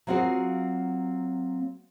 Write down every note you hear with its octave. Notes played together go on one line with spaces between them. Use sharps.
F#3 A#3 C4 F4 F#4 G#4